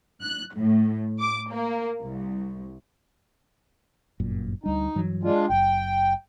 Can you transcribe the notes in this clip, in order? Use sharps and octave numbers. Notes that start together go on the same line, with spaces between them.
F#6
A2
D6
A#3
C2
G1 F#2 A#2
D2 G3 D4 D#4
G2 E3 F#3
G#3 D4 F4
F#1 F#2 G5